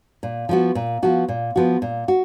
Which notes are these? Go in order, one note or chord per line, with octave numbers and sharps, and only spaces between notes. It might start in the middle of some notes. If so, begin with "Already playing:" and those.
A#2
F3 B3 F#4
A#2
F3 B3 F#4
A#2
F3 B3 F#4
A#2
F#4